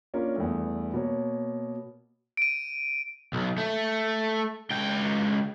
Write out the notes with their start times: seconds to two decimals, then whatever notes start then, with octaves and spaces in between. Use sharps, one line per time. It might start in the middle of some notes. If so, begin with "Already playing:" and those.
0.14 A#3 C#4 D4 F4 A#4
0.36 E2 G2 A3
0.94 B2 A#3 C#5
2.37 D7 D#7
3.33 B1
3.58 A3
4.70 C#2 G5